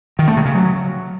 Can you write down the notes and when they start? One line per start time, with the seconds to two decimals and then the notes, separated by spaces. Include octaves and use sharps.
0.19 D#3
0.28 A3
0.37 C3
0.45 C#3
0.54 F#3